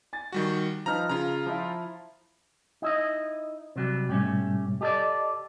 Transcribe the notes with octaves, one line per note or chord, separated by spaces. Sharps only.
G#5 A6
D#3 G3 F#4
F3 D#4 B4 A#5 F6
C#3 F4 A#5
F3 E4
D#4 E4 D#5
C3 F#3 G3
G#2 B2 G3 A3 C#4 G4
G4 A4 D5 D#5